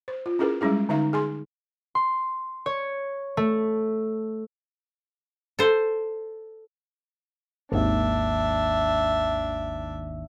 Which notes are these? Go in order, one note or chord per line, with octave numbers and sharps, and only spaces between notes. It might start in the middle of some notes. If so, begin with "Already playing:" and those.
C5
F4
C#4 E4 G#4 A#4 B4
G3 G#3 C#4 E4 G#4
D3 D#4 E5 F5 A#5
G#4 G#5 C6
C6
C#5
A3
A4 C5
G#1 D#2 D4 E5